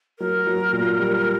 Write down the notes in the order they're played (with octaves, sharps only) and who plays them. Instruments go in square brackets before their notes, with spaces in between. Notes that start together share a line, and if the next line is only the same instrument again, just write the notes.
[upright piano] F#3 [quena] A#4
[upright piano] F#3
A#2
G3